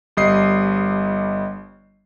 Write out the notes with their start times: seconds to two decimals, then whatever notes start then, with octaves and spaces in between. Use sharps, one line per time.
0.17 G1 G3 D#5 D#6 C7